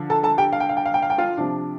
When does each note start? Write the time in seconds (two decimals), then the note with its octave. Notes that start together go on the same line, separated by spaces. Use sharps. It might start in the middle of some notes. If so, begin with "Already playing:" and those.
Already playing: D3 F3 D4 F4
0.10 A4 A5
0.23 A4 A5
0.38 G4 G5
0.53 F5
0.60 G5
0.69 F5
0.77 G5
0.86 F5
0.94 G5
1.02 F5
1.10 G5
1.18 F4 F5
1.37 C3 F3 D4